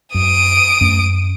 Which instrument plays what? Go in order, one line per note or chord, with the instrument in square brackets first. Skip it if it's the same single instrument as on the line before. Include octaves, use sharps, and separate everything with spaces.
[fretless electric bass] F#2 [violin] D#6 D7
[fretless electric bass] F#2 A3 C#4